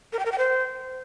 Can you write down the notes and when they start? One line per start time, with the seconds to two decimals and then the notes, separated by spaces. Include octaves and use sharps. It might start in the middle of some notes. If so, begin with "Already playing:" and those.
0.13 A#4
0.19 G5
0.25 A#4
0.32 G5
0.38 C5